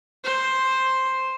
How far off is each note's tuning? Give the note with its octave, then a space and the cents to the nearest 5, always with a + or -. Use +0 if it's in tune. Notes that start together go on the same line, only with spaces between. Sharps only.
C5 +5